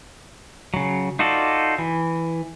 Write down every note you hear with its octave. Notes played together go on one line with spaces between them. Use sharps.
C#3 F#3
D#4 F4 F#4 A4 D5
E3